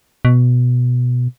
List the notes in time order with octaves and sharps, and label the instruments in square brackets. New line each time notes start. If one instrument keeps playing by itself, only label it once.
[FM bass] B2